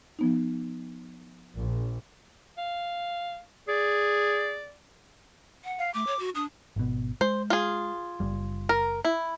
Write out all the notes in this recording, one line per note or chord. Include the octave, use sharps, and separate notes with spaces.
F3 B3 D#4
A#1
F5
G#4 D5
F#5
F5
A3 D6
C#5
F#4
D4 D#6
G#1 B2
G#3 C5
F4 G#4
F#1 G3
A#4
E4